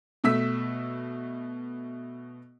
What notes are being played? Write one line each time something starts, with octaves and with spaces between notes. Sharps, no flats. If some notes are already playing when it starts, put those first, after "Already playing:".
B2 A3 E6 B6